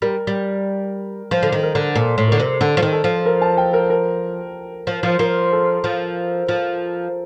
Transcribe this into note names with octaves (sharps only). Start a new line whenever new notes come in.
G3 A#4
G3
F3 C5
D3
D#3
A#4
D3
A#2 A4
A2
D3 A#4
C3
D3 A4
F3
D#3
A4
F3
A#4
A5
G5
A#4
A#4
F3
F3
F3 A#4
A4
F3
F3